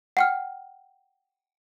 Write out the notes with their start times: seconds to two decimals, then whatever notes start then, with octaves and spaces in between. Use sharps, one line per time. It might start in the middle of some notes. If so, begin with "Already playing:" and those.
0.17 F#5 G5 F6